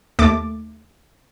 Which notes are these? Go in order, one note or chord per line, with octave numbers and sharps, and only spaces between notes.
D#2 A3 D6 A6